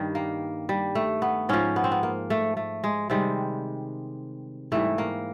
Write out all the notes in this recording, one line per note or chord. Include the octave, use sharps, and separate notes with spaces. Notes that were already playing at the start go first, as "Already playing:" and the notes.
Already playing: G2 D#3 G3
A#3
G3
A3
B3
G#2 F3 C#4
B3
C4
B3
A#3
A3
A3
G#3
C3 D#3 G3 G#3
G#2 E3 G3 A3
A#3